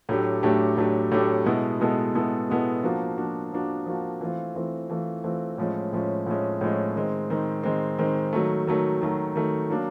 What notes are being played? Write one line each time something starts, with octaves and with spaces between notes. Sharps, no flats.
A2 F#3 A3 D4 G4
A2 F#3 A3 D4 G4
A2 F#3 A3 D4 G4
A2 F#3 A3 D4 G4
B2 G#3 B3 E4 A4
B2 G#3 B3 E4 A4
B2 G#3 B3 E4 A4
B2 G#3 B3 E4 A4
F3 A#3 D4 F#4
F3 A#3 D4 F#4
F3 A#3 D4 F#4
F3 A#3 D4 F#4
E3 A3 C4 F4
E3 A3 C4 F4
E3 A3 C4 F4
E3 A3 C4 F4
A2 F3 G#3 C#4
A2 F3 G#3 C#4
A2 F3 G#3 C#4
A2 F3 G#3 C#4
D#3 G#3 C4
D#3 G#3 C4
D#3 G#3 C4
D#3 G#3 C4
D#3 F#3 A3
D#3 F#3 A3
D#3 F#3 A3
D#3 F#3 A3
F#3 A#3 D4